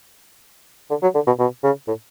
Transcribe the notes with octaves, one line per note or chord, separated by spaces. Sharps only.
D3
F#3
D3
B2
B2
C#3
A2